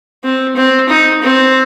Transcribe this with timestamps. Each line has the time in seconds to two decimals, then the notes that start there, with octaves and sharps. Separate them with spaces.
0.24 C4
0.56 C4
0.89 D#4
1.22 C4